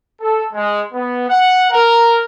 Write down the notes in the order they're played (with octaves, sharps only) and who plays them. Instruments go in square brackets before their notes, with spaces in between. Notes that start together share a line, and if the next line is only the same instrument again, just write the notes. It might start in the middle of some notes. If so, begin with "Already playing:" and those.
[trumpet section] A4
G#3
B3
F#5
A#4